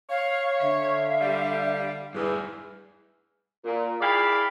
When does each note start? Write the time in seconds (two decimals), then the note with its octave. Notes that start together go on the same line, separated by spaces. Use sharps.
0.10 C#5 F5
0.62 D3 E5 F5
1.21 G3
2.15 E2 G2 G#4
3.65 A#2
4.01 E4 G#4 D5 F5 G5 B5